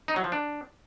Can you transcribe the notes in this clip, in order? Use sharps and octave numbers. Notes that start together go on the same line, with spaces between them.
D#4
F#3
F3
D4